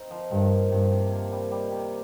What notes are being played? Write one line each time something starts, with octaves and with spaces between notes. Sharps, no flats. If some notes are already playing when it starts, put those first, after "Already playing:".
Already playing: C4 D#4
F3
G2 D#3
A#3
G2 C3
C3
A#3
G3
G3
C3